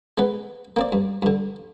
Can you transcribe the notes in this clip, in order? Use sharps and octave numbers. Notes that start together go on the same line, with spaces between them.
G#3 B3 B4
A#3 C4 D5
G2
G2 D3